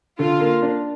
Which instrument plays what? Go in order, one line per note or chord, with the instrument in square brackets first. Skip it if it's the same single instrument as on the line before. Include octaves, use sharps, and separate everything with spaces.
[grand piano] D3 [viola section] F4
[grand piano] A#3
D4